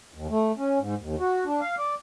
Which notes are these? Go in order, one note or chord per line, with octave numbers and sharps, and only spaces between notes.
D#2
A3
C#4
G#2
D#2
F#4
D4
F5
D5